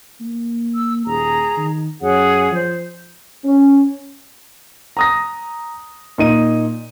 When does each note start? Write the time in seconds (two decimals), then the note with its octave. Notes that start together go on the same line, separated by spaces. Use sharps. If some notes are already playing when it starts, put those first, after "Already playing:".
0.21 A#3
0.74 E6
1.06 D#1 G#4 A#5
1.57 D#3
2.01 F#2 G#4 C#5 F#5
2.51 F3 C5
3.45 C#4
4.97 A#5 D#6 A#6
6.18 A#2 D#4 D#7